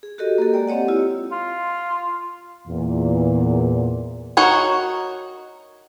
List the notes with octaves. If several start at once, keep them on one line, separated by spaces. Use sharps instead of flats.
G#4
F#4 G4 A4 A#4 D#5
A#3 G4 A4
G#3 A#3 D5 G5
C4 G4 C#5 D#5 F#5
E4 F4 G4
F4
E2 A#2
D#4 F#4 A#4 C#5